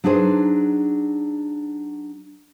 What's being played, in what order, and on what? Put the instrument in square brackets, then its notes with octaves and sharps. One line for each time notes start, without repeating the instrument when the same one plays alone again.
[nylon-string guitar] F#3 D4 D#4 G#4 C5